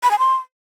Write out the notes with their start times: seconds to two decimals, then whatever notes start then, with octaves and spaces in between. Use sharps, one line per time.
0.03 B5
0.11 G#5
0.19 C6